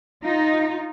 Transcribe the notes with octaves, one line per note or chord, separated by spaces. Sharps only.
D#4 F4